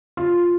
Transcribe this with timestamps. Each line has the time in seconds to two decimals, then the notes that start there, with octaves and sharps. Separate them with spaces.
0.17 F4